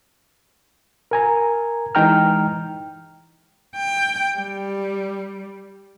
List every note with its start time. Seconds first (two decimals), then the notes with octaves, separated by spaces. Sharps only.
1.11 A#4 G#5 A#5
1.95 E3 G#3 D#4 G5 A#5 F6
3.77 G5
4.36 G3